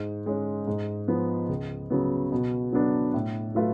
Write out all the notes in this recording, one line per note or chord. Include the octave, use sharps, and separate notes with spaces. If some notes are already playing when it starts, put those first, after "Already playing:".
Already playing: G#2
G#3 C#4
G#2
F3 B3
C#2
C#3 F#3 B3
B2
F#3 B3 D4
A2
F#3 A3 F4 B4